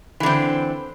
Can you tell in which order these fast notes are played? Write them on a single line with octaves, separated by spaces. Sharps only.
E3 D3 C4